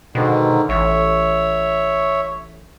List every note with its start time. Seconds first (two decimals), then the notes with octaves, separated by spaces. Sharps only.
0.15 G#2 B2 D3 D#3
0.69 A1 C#5 E5